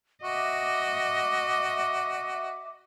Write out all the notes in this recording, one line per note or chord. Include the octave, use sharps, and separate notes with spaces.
F#4 D#5 E5 D6